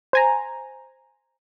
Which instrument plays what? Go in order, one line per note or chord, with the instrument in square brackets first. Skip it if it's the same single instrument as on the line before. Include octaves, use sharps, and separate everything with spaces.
[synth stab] C5 G#5 A#5